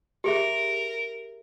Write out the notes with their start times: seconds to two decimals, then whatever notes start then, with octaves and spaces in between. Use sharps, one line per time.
0.24 G4 G#4 A#4 E5